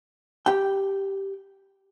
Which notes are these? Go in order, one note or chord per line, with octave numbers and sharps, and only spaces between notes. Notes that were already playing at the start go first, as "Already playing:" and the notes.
G4 G5